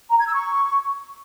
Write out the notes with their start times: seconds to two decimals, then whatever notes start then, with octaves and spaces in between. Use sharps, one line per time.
0.11 A#5
0.18 G#6
0.26 E6
0.34 C#6